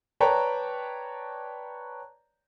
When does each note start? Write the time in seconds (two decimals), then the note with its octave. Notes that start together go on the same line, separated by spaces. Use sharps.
0.21 B4 C#5 D5 G5 A5 A#5